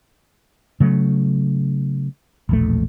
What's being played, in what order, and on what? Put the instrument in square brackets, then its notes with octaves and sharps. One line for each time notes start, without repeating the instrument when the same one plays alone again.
[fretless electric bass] C#3 F#3 A3
E1 A#1 A3